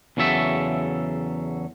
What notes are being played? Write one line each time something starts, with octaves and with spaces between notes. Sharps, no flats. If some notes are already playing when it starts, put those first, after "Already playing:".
E2 C#3 F#3 A4 E5